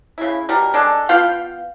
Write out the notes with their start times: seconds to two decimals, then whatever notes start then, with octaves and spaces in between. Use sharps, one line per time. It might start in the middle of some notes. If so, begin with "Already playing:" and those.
0.18 C#3 E4
0.49 B2 G3 A#4
0.74 G#3 D4 G#4 A4
1.09 B3 F4 F5 G5